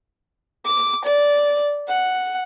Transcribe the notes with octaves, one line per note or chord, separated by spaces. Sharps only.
D6
D5
F#5